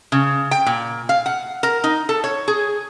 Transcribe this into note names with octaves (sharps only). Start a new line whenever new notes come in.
C#3
G5
A#2
F5
F#5
A#4
D#4
A4
C#5
G#4